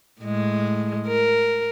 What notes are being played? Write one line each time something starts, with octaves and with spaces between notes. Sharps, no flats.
A2 G#3
A#4